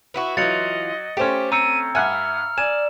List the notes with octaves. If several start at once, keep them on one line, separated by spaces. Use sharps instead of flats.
B3 E4 F#4
E3 F#3 F4 D#5 A6 C#7 F#7
A3 C#4 G4 C5
C4 A#5 E6 C#7 D#7
G2 E5 F#5 G#5 F6
D5 G#5 E7